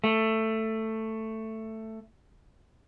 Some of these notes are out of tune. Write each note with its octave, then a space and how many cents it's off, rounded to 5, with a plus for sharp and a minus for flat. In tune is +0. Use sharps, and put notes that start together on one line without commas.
A3 +10